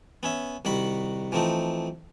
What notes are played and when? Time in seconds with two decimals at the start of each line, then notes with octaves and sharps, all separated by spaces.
0.23 B3 C#4 E5
0.65 C2 D#3 F#4 F#5 B5
1.32 E3 F3 A3 C4 D#4